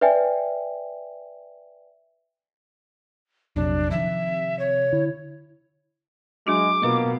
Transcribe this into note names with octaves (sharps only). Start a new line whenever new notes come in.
B4 D5 E5 G5 G#5
A#1 F2 C3 F#3 D4
D#3 F3 E5
C#5
D3 E4
F#3 G#3 D4 F#4 D6
B2 A#3 F4 B4 D#5